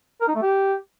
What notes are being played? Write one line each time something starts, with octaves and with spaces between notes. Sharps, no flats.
A#4
D#4
A3
G4